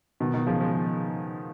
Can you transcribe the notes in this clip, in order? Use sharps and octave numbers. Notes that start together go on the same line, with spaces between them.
B2 D#3
B2 D#3
C#3 F3
F3 G#3